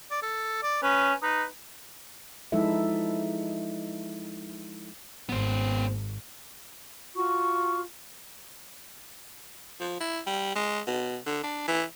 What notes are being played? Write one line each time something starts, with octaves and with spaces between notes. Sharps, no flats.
D5
A4
D5
C#4 B4
D#4 B4
F3 G#3 D#4 E4 A4 E5
G#1 B3 C5
F4 F#4 C#6
F3
E4
G3
G#3
B2
D3
D4
E3